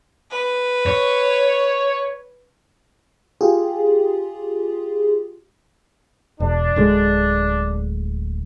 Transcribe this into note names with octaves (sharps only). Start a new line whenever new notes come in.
B4
C#5
F4 G4 G#4
E1 D4
D1 D3 G#3